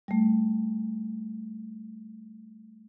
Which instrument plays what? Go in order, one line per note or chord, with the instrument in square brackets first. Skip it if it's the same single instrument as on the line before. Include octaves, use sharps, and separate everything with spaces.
[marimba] G3 A3